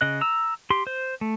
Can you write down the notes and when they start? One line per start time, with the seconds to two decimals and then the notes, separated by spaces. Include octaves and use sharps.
0.01 C#3 D#5 F#6
0.21 A#5 E6
0.70 G4 C6
0.87 C5
1.21 A3